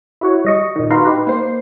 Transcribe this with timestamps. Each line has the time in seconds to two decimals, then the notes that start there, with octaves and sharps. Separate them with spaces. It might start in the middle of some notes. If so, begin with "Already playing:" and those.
0.21 E4 F#4 C#5
0.45 G3 D#5 C#6
0.76 A#2 D#3
0.90 D#4 F#4 B4 F5 A#5 C6
1.05 D#4 G4 B4
1.27 A#3 C5 C7